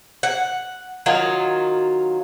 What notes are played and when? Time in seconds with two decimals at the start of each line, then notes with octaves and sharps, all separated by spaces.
0.23 F#5
1.06 D#3 F#3 F4